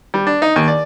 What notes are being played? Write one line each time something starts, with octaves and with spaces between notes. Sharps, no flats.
G3
D4
D#4
D#2
D5